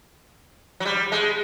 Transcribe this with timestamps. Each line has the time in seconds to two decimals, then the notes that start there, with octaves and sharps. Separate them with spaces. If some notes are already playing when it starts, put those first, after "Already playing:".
0.80 F#3
0.85 G3
1.12 G#3